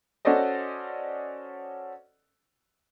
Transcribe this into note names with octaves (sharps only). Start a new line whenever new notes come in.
C#4 F#4 A4 C5 D5 D#5